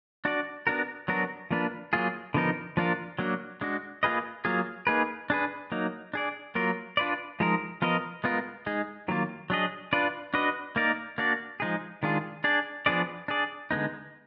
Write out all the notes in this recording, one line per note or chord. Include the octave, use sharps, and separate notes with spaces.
D4 F#4 D5
B3 D4 F#4 A#4
F#3 B3 D4 F#4 A#4
F3 A#3 D4 F4 B4
F#3 A#3 F4 G#4
D3 F3 B3 D#4 A#4
F3 A#3 D4 F4 A#4
F#3 A#3 D4 F#4
G#3 D4 F#4
A#3 F4 G#4 B4 D#5
F#3 A#3 F4 G#4
A#3 D#4 G#4 B4
D4 G#4 B4
F#3 A#3 D#4
D4 G#4 D5
F#3 A#3 F4 A#4
D4 F4 B4 D5
F3 G#3 D#4 A#4
F3 B3 F4 A#4 D#5
G#3 B3 F4 A#4
G#3 D#4 G#4
D#3 F#3 A#3 F4
F#3 D4 G#4 D#5
D4 F4 B4 D5
D4 F#4 B4 D#5
A#3 D#4 A#4 D5
A#3 D4 F#4 D5
F3 G#3 D#4 G#4
D#3 G#3 D4 F4 G#4
D4 G#4 D5
F3 B3 D4 G#4 D5
D4 G#4 D5
D3 G#3 B3 D#4